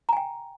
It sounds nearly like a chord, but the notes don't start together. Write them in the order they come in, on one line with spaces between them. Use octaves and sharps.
A#5 G#5 G5